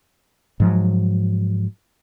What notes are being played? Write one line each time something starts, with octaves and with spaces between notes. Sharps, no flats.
G#2 F3 F#3